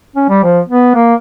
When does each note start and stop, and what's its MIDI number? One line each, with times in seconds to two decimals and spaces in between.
0.16 0.26 61
0.29 0.39 55
0.44 0.60 53
0.69 0.91 59
0.95 1.14 58